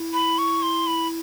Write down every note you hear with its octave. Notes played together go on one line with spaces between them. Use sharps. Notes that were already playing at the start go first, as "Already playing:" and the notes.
Already playing: E4
B5
C#6
C6
B5